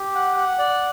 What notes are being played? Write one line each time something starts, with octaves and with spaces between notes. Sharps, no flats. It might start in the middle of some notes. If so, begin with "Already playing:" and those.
Already playing: G4
F#5
F#5
D5